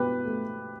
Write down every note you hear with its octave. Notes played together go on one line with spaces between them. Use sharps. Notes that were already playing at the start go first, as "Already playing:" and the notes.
Already playing: B2 G4 B4
A3